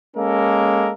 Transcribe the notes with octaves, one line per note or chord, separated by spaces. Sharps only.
G#3 A#3 C#4 A4 A#4